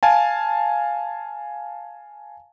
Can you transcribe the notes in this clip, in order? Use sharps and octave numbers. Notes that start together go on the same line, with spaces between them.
F5 G#5 A5